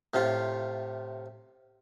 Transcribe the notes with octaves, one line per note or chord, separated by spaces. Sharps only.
A2 C3 F4